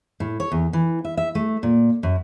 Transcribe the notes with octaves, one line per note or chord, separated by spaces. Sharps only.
A2
C#5
E2
E3
E5
E5
A3
A#2
F#2